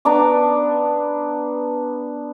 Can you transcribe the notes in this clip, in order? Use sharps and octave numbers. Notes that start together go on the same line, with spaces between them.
B3 D4 A#5 D6